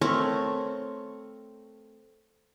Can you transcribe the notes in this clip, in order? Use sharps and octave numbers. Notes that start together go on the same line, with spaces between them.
A3 C4 A#4 C#5